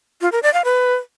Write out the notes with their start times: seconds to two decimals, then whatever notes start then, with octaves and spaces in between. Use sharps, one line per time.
0.21 F4
0.32 A#4
0.43 D5
0.54 F5
0.64 B4